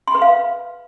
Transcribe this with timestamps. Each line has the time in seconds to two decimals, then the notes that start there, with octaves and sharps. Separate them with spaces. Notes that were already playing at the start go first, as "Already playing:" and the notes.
0.08 C6
0.15 B4
0.22 F5